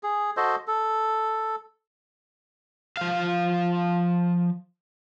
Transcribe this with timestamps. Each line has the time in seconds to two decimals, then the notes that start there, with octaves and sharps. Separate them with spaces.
0.03 G#4
0.37 F#4 A4 C5 D#5
0.67 A4
2.97 F3 F5